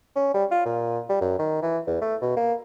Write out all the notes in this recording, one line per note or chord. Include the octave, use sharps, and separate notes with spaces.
C#4
G3
F4
A#2
G3
F#2
D#3
E3
E2
A3
B2
A#3